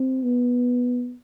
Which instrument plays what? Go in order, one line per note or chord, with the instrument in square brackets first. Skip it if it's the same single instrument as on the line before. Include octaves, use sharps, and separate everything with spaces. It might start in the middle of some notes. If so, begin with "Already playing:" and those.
Already playing: [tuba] C4
B3